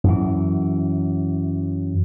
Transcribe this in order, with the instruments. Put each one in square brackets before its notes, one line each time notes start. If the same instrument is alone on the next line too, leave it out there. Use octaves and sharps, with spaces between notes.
[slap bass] F#2 E3